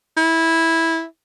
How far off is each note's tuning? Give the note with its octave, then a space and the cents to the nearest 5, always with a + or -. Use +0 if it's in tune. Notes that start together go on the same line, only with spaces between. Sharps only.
E4 -10